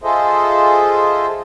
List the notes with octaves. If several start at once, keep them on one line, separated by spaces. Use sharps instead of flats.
F4 G#4 A4 C5 D#5 E5